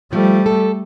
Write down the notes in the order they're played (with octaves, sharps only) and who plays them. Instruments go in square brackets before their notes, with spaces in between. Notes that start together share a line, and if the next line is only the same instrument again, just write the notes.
[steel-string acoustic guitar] F3 [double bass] G3 A3
[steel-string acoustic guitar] A4